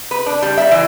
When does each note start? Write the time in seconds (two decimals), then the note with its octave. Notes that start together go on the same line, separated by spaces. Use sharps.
0.11 B4
0.26 D4
0.42 G3
0.57 E5
0.71 E3